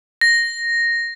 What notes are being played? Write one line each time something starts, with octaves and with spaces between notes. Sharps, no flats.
A#6